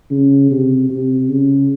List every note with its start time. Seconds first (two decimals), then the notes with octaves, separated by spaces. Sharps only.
0.11 C#3
0.51 C3
0.89 C3
1.28 C#3